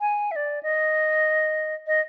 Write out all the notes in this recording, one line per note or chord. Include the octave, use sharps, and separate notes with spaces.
G#5
E5
D5
D#5
D#5